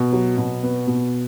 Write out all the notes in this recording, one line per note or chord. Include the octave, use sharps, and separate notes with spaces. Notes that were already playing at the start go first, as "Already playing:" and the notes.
Already playing: B2
F#3
B2
B3
B2